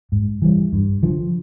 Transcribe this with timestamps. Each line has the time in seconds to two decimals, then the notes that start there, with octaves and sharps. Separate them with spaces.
0.12 G#2
0.42 E3 G3
0.73 G2
1.03 D3 F3